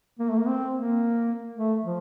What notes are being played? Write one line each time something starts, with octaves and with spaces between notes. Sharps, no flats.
A#3
A3
A#3
C4
A#3
A3
F3